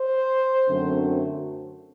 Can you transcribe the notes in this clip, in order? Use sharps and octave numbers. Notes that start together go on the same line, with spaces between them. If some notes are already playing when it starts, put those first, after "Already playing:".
Already playing: C5
F#2 D3 F#3 A3 C4